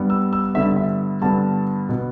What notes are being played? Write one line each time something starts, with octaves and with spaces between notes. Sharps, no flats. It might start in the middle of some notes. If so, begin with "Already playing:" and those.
Already playing: G2 G3 B3
E6
E6
G2 D3 B3 E5
E5
G2 D3 B3 A5
B2 B3